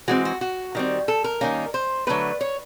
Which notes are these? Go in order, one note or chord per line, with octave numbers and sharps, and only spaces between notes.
E3 G#3 C4 F#4
F#4
F#4
D#3 G3 C4
A4
A#4
D#3 G3 A#3 C#4
C5
D3 F#3 A3 C4 B4
C#5